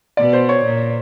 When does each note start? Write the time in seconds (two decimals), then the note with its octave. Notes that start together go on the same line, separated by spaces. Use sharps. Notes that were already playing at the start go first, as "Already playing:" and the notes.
0.17 B2 D5
0.33 C5
0.49 C#5
0.65 A#2